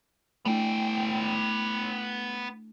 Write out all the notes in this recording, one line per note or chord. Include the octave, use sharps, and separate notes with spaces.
A3 B3 D4 E4 G5